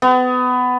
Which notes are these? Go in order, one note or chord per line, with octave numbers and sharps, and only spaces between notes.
B3